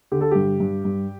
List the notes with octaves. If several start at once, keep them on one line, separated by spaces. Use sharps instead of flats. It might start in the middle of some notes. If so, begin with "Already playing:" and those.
D3 G4
A4
G2 G4
G2
G2